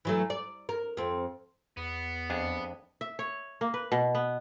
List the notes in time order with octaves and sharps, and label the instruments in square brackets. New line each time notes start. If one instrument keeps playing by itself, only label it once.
[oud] E3 F#3 A3
D5
A#4
F2 C4
[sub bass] E2 [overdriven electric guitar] B3
[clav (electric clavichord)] F2 D4 G#4
[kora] E5
C#5
A#3
B4
B2
B3